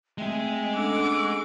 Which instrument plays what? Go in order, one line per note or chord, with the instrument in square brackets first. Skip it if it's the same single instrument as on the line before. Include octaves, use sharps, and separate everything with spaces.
[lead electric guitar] G#3 G#4 [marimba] A3 C4 [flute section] E5 G5
[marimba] C#4 D4 A4 [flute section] F#5 E6 F#6 [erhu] D6